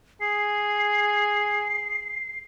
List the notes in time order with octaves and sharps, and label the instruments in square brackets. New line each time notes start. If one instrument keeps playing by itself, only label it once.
[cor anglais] G#4 [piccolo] C7